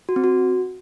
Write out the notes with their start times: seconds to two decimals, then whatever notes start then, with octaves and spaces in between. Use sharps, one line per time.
0.09 F#4
0.16 C4
0.24 F#4